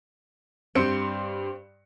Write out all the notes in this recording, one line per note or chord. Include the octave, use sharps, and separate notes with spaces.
G2 C4 C6 C#7